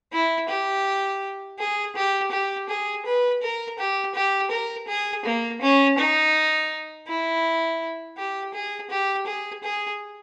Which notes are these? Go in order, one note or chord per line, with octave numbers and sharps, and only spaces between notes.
E4
G4
G#4
G4
G4
G#4
B4
A#4
G4
G4
A#4
G#4
A#3
C#4
D#4
E4
G4
G#4
G4
G#4
G#4